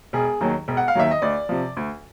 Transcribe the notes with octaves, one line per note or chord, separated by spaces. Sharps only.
E1 G#4
D#2 D#3 F#3
E1
F#5
F5
D#2 D#3 F#3 E5
D#5
D2 D5
C3 F3
D2